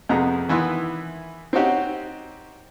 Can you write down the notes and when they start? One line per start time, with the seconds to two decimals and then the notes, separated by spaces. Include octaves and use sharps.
0.09 F2 C3 B3 F#4 G#4 A#5
0.49 D#3 E3 B3 E4 C6
1.53 C4 C#4 D#4 F#4 G4